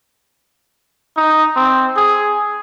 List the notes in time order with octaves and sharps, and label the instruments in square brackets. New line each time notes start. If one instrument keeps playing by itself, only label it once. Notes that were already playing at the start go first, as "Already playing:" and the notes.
[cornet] D#4
C4
G#4